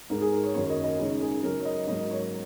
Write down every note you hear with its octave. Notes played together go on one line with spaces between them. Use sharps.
G#2 G#3 D#4 A#4
G#4
A#4
C#5
F#2 D#3 F#3 A#3 C#4 C#5
D#5
D#5
C#3 G#3 D#4 C#5
G#4
C#3 F#3 C#4 A#4
C#5
D#5
G#2 F#3 A#3 D#5
C#5